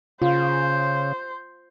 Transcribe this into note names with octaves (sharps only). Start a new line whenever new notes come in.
C#3 F4 C5